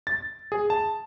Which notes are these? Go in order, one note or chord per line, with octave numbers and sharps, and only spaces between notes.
A6
G#4
A5